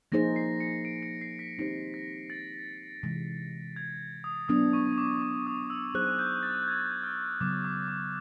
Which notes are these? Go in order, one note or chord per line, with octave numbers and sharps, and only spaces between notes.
F3 A#3 D#4 G#4 C5 A#6
C7
C#7
D7
C#7
C7
B6
G#3 C4 D#4 G4 C5
A#6
A6
C3 E3 G#3
G#6
D#6
F#3 B3 D4 D#6
C#6
D6
D6
D#6
E6
F#3 B3 D#4 G#4 C5 F#6
G6
A6
G6
G#6
G6
F6
F6
C#3 F#3 B3 D6
D6
D6